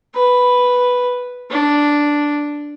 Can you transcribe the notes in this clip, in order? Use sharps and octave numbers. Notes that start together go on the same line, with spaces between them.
B4
D4